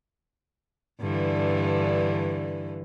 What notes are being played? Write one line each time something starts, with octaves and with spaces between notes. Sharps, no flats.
G2 D3 E3